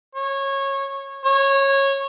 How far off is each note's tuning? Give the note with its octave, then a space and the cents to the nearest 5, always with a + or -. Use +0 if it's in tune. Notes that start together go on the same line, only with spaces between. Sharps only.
C#5 -20
C#5 -15